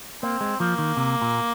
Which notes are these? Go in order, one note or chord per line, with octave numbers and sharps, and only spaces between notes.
A#3 C4
G#3
F3 A#3
D#3
C3
A#2